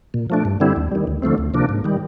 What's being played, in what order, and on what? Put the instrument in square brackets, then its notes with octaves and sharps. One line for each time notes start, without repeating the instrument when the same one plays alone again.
[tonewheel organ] A#2
F3 A3 D4
G2
D3 G3 C4 E4
D#2
D#3 G3
D2
D3 F3 A3 C4
D2
C3 F3 A#3 D4
G#2
D#3 G3